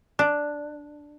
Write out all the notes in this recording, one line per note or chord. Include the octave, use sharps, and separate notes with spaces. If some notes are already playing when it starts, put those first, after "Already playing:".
D4